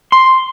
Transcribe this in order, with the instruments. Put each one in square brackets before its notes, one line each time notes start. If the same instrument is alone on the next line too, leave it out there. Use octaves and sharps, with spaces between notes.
[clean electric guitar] C6